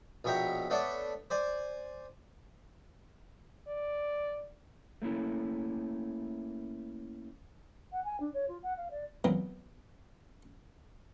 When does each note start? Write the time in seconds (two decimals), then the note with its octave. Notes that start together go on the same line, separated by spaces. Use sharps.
0.24 A#1 B2 C#5 E5 G5 A#5
0.70 A3 B3 D4 C#5 D5 A5
1.30 C5 D5 G#5
3.68 D5
5.02 A3 A#3 C#4 E4
7.92 F#5
8.04 G#5
8.20 D4
8.33 C#5
8.48 F4
8.63 F#5
8.77 F5
8.90 D5
9.24 A#2 F#3 G#3 B3 C4